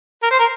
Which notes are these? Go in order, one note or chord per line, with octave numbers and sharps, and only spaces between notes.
A#4
C5
A#4